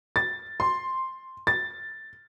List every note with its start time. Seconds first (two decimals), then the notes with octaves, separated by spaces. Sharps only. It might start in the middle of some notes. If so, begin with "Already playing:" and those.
0.16 A6
0.60 C6
1.47 A6